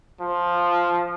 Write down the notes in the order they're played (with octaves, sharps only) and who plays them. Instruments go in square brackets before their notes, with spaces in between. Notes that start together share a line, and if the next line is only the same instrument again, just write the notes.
[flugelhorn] F3